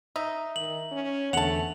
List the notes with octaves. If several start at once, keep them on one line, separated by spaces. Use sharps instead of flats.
D#4 E5 A#5
D#3 F#7
C#4
E2 D3 A3 F#5 A5 F7 F#7